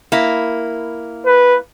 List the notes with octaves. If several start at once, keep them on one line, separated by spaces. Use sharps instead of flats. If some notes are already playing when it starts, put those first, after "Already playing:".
A#3 E4
B4